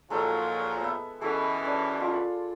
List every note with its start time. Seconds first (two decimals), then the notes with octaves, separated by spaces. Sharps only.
0.10 A#2 F3 F#3 G#3 D#4 A4
0.80 B3 E5
1.21 F#2 B2 E3 G#4 A4 C#6
1.65 C#4 D4 D5
2.00 F4 C6